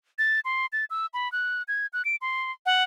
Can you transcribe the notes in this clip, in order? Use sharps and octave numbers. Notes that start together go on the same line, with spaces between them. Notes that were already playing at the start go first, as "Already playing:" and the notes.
A6
C6
A6
E6
B5
F#6
G#6
F#6
D7
C6
F#5